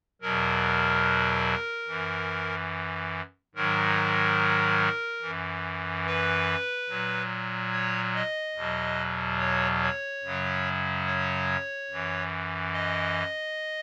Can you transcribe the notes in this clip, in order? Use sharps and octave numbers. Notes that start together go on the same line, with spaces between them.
E2 B2 F#3 A#4
F#2 E3
G#2 D#3 F#3 A#4
F#2 E3
B4
A#2 F#3
C#5
D#5
E2 B2 F#3
C#5
C#5
F#2 C#3 F#3
C#5
F#2 E3
D#5